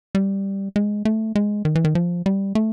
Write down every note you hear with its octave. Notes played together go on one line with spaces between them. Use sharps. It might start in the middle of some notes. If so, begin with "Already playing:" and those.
G3
G#3
A3
G#3
D#3
E3
D#3
F3
G3
A3